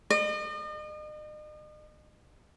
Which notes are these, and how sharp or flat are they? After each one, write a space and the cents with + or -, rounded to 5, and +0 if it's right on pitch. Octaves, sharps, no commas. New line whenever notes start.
D#5 -40